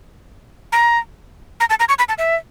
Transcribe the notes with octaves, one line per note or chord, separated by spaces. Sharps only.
A#5
A#5
A5
A#5
C#6
B5
A5
E5